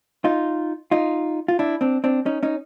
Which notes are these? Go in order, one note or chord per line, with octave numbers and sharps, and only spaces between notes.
D#4 F4
D#4 F4
F4
D4 E4
C4 D4
C4 D4
C#4 D#4
C#4 D#4